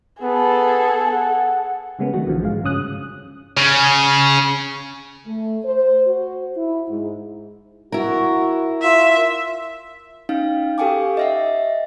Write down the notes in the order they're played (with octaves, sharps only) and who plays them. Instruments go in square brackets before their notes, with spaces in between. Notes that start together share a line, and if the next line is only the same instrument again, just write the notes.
[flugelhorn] B3 [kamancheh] G#4 A4
[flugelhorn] F#5
[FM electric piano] C#3 G3 G#3 A#3 B3 C#4
D#3 F#3 A3 F#4
A#1 D3 E3 F3
G#2 G#3 F5
G2 C#3 C#4 D#6 F#6
[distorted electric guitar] C#3
[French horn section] A3
C5
F#4
E4
G#2
[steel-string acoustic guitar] E4 A#4 [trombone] F#4
[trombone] F4 [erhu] E5
[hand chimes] C#4 D#4 F5
G4 A4 F5 G5 G#5 D6
D#5 E5 F#5